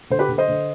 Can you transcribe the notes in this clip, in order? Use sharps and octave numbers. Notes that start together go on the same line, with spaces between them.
D3 C5
G4 B4
D3
C5 D#5
D3